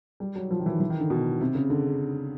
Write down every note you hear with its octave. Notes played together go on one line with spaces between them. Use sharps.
G3
F#3
F3
D#3
E3
E3
D#3
D3
B2
C3
C#3
D3